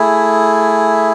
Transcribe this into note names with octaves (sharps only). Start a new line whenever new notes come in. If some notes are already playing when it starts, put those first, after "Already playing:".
Already playing: A3 E4 G#4